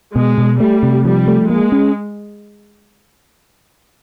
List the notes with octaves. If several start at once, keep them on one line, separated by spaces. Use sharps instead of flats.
B2 G#3
B2
G3 A3
C3
F3 G3
A3
G#3 A#3
C#4